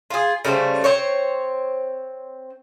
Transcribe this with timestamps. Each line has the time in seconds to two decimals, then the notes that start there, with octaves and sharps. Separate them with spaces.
0.10 F4 G#4
0.45 C#3 G3 A3 C5
0.84 C4 C5 C#5